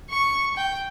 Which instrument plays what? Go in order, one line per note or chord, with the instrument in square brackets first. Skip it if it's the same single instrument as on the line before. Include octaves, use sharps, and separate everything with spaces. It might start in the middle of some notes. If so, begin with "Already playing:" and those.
[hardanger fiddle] C#6
G5